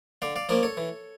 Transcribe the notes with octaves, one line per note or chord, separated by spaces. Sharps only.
D3 D5 F5
D5 F5
F3 A#3 C#4 A#4 D5
A4 C#5
E3